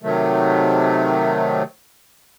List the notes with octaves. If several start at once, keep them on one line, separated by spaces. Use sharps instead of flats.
C3 D#3 F#3 A3